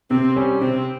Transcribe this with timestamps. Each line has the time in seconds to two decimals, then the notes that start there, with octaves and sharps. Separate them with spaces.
0.11 C3 C4
0.36 G3 C#4
0.61 C3 C4